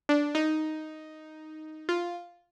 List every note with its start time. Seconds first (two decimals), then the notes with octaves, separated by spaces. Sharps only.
0.09 D4
0.35 D#4
1.89 F4